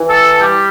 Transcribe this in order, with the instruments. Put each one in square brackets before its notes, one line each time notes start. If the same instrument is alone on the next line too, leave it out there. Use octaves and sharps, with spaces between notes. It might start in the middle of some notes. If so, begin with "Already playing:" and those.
Already playing: [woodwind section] E3
A4
G3 G4